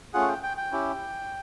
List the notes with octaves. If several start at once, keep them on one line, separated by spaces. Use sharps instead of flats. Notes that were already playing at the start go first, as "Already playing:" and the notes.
A3 C#4 F4 G#4 F#5
G5
G5
G5
C#4 E4 G4